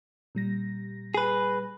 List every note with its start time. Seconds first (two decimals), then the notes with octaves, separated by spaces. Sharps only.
0.35 A#2 G3 A#6
1.14 G#4 B4